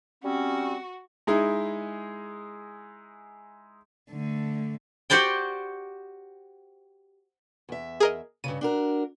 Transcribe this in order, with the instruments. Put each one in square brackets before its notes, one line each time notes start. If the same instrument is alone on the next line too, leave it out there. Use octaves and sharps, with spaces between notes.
[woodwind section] G3 C4 C#4 [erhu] F#4
[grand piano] G#3 D#4 E4 G#4
[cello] D3 A3
[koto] F#4 G4 C5 D5 G5
[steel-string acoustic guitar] E2 E5
[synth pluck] G#4 A#4 D#5
[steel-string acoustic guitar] G2 A#2 C#3 [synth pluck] D#7
[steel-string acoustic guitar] D4 F#4 A#4